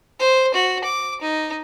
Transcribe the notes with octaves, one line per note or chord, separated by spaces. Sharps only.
C5
F#4
D6
D#4